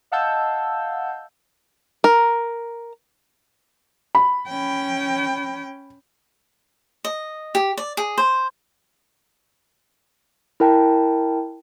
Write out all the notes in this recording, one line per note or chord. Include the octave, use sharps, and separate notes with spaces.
D#5 F5 F#5 A5 E6 G6
A#4
B5
C#4 G5
D#5
G4
D5
G#4
C5
E4 A#4 G5 A5